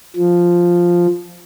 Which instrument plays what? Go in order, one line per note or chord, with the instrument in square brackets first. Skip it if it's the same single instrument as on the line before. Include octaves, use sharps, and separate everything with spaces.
[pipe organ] F3